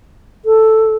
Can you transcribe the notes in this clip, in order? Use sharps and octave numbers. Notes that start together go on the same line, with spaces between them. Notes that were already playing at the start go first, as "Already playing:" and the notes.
A4